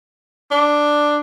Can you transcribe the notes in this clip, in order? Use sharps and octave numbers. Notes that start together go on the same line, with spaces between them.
D4